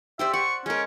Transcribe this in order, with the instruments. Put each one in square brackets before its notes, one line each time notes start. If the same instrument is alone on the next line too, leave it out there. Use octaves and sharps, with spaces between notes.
[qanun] G4 C5 D5 [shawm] E5
[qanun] F#5 [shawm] C#6
[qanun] G#3 A#4 [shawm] C#4